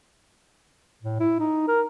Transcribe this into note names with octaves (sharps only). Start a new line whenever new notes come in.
A2
E4
D#4
A#4